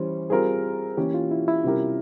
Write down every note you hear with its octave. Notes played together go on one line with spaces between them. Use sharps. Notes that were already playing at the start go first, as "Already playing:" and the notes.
Already playing: E3 G3 C#4 C5
G3 C4 F4 G#4 A#4
E3 A#3 C#4 G4
F4
E4
E4
C3 G3 C#4 G4 A#4